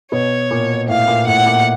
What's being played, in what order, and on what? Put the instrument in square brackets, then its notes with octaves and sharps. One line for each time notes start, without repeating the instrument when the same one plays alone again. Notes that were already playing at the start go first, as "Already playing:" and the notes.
[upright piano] B2 [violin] C#5
[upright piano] A#2
[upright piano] A2 [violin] F5
[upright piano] A#2
[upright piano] A2 [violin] F#5
[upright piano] A#2